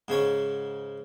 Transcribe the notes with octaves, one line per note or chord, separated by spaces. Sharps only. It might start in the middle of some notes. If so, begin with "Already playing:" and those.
G#2 C#3 C#5 C#6